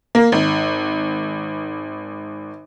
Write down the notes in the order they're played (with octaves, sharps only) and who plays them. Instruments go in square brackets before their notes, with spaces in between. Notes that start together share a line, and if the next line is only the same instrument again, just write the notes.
[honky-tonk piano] A#3
G#1